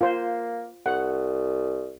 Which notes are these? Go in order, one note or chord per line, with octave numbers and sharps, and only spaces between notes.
A#3 F4 C5
C2 F#5